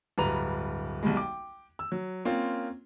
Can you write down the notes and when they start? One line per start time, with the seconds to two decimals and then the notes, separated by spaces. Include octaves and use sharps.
0.18 D1 G2 B4 A#5 F7
1.03 B1 G3 G#3
1.17 G5 D6
1.79 E6
1.92 F#3
2.25 A#3 C4 C#4 F4